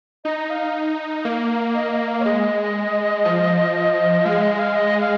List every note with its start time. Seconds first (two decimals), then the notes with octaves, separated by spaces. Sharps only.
0.24 D#4 D#5
0.50 F5
1.25 A#3
1.74 D#5
1.92 D#5
2.08 F5
2.20 C#5
2.25 G#3 D#5
3.25 F3
4.25 G#3 F5
4.42 D#5
4.59 F5
4.75 D#5
5.01 F5